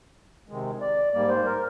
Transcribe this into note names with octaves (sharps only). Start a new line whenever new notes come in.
C3 D#3 G#3
D5
G#2 G3 A#3 D5
C5
A#4